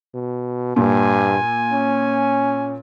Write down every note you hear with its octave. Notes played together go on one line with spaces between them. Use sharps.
B2
G2 A#2 G#5
C#4